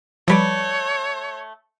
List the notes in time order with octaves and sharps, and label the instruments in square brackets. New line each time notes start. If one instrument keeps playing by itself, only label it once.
[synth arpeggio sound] F3 G3 [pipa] A3 B4 D5 [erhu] C#5